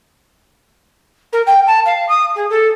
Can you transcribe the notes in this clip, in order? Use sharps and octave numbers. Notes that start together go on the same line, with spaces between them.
A#4
G5
A5
F5
D#6
G#4
A4